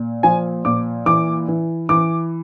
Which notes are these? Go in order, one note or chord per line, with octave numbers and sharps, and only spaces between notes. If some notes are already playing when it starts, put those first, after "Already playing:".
Already playing: A#2
F3 G#5
A#2 D6
E3 D6
E3
E3 D6